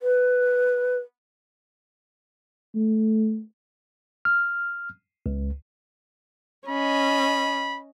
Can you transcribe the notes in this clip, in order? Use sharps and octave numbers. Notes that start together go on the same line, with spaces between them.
B4
A3
F6
C#2
C#4 D#5 B5